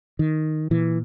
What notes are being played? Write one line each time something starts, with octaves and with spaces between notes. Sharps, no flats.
D#3
A#2 E3